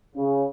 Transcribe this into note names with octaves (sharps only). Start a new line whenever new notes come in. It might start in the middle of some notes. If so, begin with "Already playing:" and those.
C#3